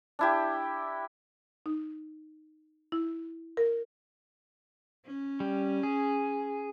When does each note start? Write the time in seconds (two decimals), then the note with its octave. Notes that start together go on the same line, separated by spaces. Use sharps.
0.19 D4 E4 G4
1.66 D#4
2.92 E4
3.57 A#4
5.05 C#4
5.40 G3
5.83 G#4